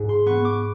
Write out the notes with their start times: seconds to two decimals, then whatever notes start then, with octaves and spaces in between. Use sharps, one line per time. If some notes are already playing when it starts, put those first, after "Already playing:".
Already playing: G#2
0.09 C6
0.26 B3 C#6
0.45 D6